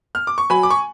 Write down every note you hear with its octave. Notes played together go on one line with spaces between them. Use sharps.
F6
D6
C#6
F#3 G#5 B5
D6
C#6